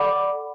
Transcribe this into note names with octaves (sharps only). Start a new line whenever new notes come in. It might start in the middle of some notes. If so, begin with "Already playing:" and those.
Already playing: A4 D5 F#5 B5 D6